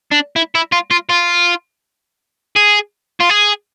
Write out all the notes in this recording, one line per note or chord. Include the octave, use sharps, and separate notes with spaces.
D4
E4
E4
F4
F4
F4
G#4
F4
G#4